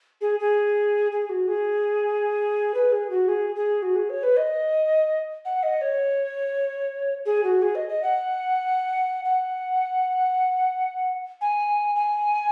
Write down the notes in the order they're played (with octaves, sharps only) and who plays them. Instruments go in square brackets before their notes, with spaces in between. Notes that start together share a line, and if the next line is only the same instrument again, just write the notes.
[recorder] G#4
G#4
G#4
F#4
G#4
B4
G#4
F#4
G#4
G#4
F#4
G#4
C#5
B4
D#5
F#5
D#5
C#5
G#4
F#4
G#4
D#5
D#5
F#5
F#5
G#5
G#5